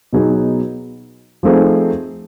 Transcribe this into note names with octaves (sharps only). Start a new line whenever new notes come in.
B2 F#3 B3 D#4 G#4
F3 A3 C4 D#4 G#4